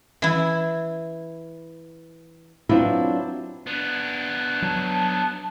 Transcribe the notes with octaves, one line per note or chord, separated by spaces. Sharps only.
E3 E4
F#3 B3 C4 D4 E4 F4
B3 D4
F#3 A5